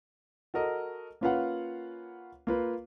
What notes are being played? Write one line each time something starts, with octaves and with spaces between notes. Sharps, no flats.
F#4 A4 A#4 D#5
A#3 C#4 F4 B4 F5 F#5
A#3 F4 B4